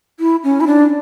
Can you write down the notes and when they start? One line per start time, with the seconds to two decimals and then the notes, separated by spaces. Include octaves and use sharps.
0.20 E4
0.44 C#4
0.61 E4
0.67 D4